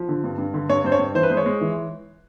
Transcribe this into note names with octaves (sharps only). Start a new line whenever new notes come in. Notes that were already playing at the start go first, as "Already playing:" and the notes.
Already playing: F3
D3
G2
G2
D3
G2 C#5
G2 C5
C#5
G2
E3 C5
B4
G#3 C5
C#5
G#3
E3